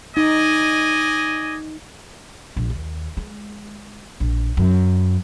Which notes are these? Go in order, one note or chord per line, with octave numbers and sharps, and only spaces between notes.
D#4 D5 D#5 G#5
A#1
D#2
G#3
A#1
F#2